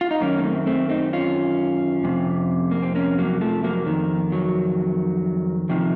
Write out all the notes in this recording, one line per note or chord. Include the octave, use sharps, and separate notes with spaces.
F4
D#4
F#2 D#3 A#3 C#4
A#3
A3 C4
A3 C4
C4 D#4
C#4 F4
F2 C3
A#3
C4
A#3 C#4
F#3 A#3
F3 A3
F#3 A#3
F2 D#3
F#3
F2 C3 D#3 F3